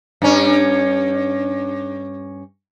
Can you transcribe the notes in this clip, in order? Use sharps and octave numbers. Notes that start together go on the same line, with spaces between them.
G2 C#4